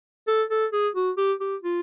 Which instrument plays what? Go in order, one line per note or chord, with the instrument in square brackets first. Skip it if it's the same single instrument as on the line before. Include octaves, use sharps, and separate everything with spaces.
[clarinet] A4
A4
G#4
F#4
G4
G4
F4